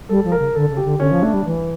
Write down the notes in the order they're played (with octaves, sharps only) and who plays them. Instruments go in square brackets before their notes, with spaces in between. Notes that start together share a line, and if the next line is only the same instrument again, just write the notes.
[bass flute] G3 [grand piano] A4
[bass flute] F3
[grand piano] A#4
[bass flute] C#3
[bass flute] D3 [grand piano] A4
[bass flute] C#3
[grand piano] G4
[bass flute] D3
[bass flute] D3 [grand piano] C#4
[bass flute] F3
[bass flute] A3 [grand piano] D4
[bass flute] G3
E3